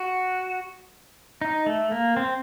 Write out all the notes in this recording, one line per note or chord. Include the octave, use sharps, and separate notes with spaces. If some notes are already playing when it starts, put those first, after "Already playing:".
Already playing: F#4
D#4
A3
A#3
C4